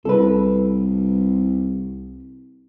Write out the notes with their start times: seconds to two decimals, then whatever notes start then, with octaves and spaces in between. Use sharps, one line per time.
0.05 C2 A4 B4